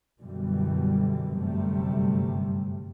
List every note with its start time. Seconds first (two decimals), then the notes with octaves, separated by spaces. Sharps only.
0.22 F#2 B2 D3 E3 G3
1.39 G1 F#2 C3 G3 A3